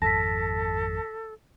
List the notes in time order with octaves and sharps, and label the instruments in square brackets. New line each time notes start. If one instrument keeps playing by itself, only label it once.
[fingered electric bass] G#1 F2 [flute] A4 [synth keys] A5 [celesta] A#6 B6